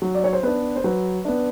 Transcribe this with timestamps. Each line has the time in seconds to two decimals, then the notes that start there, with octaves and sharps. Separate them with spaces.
0.02 F#3
0.15 D5
0.24 C#5
0.33 C5
0.43 B3 D4 B4
0.76 C5
0.84 F#3 B4
1.25 B3 D4